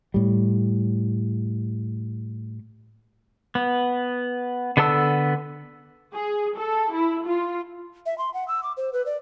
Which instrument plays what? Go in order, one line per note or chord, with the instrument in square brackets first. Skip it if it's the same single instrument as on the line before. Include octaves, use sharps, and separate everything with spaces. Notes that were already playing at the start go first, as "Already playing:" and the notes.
[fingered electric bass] A2 G3
[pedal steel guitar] B3
D3 B3 A4 A5 E6
[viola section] G#4
A4
E4
F4
[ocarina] E5
C6
F#5
E6
D6
C5
B4
D5